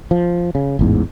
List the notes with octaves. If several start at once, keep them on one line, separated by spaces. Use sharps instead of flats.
F3
C#3
A1 E2 G#2